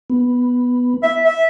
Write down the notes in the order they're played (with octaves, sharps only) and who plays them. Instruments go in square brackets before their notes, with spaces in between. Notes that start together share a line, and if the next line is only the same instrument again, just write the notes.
[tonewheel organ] B3
[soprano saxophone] E5
E5